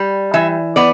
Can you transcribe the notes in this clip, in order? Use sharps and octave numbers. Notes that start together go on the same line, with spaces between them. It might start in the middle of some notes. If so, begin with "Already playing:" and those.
Already playing: G3
E3 E5
B3 D5